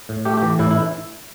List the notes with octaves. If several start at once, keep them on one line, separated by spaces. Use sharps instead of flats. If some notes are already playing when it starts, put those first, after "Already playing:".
A2
A3 G4
E3 G4
A2 E4
E4